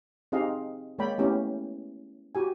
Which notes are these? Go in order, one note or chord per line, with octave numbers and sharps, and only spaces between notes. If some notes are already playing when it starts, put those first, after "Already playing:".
C4 D#4 G4 G#4 D#5 F5
G#3 A#3 C#5 D5 G5 B5
A3 B3 C#4 E4 G4
F#4 G4 G#5